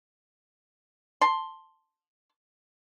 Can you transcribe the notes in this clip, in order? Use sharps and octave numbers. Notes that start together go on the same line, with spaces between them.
A5 C6